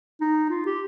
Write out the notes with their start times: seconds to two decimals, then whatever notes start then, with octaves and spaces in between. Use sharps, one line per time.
0.21 D#4
0.50 F4
0.66 G4